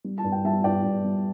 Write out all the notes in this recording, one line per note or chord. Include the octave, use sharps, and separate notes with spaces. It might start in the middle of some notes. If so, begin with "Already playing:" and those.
G3
A5
G2
G5
G3 E5 A5
G2 D5 G5
G2
G3